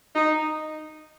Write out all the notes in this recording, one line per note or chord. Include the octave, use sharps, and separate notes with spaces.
D#4